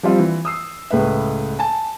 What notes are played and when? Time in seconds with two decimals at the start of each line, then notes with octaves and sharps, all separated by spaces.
0.03 F3 G3 C4 F4
0.19 E3
0.45 D#6 E6 C7
0.91 C#2 A2 G#3 B4 E5
1.59 G#5 A5